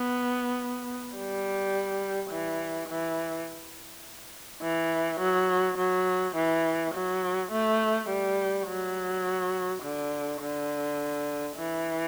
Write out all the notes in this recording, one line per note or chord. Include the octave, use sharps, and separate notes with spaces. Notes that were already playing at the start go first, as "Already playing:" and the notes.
Already playing: B3
G3
E3
E3
E3
F#3
F#3
E3
F#3
A3
G3
F#3
D3
D3
E3